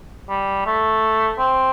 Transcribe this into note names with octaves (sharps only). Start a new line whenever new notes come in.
G3
A3
C4